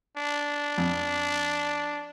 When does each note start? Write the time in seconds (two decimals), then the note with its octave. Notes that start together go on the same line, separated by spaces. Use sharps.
0.17 D4
0.78 F2